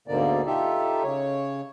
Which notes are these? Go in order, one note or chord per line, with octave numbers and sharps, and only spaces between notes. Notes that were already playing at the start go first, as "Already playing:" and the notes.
D2 G#2 B2 D3 A#3 D5
D#4 F4 G4 A4 E5
C#3 C#5